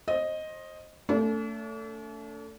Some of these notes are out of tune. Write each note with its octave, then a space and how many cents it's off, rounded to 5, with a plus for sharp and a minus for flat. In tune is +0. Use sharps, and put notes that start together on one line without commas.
C5 +30 D#5 +0
A3 +20 D4 -45